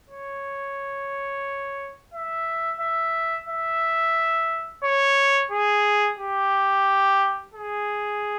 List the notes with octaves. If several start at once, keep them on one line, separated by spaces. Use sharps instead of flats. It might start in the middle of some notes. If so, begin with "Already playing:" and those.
C#5
E5
E5
E5
C#5
G#4
G4
G#4